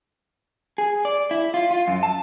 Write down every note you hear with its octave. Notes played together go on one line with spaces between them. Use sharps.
G#4
D5
E4
F4
F4
F#2
A5